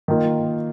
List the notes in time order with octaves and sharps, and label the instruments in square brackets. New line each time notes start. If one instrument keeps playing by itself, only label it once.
[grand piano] D#3 A#3 F4